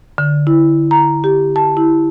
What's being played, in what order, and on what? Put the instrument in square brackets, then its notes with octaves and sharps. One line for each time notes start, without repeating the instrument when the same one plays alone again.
[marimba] D3
E4
A#5
G4
A5
E4